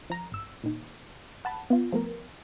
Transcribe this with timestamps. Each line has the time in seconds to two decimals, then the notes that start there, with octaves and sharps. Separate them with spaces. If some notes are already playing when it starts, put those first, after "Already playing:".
0.10 F3 A#5
0.32 G#1 E6
0.64 A#2 D#3
1.45 F#5 A5 B5
1.70 B3 F4
1.92 F3 A3 B3 A#4